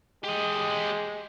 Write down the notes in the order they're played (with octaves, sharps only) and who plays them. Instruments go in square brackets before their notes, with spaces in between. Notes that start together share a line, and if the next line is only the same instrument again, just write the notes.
[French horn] G#3 [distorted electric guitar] G4 D#5